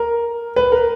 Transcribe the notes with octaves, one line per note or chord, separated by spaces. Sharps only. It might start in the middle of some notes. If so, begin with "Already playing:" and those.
Already playing: A#4
B4
A#4